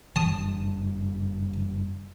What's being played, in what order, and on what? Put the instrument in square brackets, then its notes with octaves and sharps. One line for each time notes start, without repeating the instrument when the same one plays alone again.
[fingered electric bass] F#1 G2 [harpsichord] A5 D#6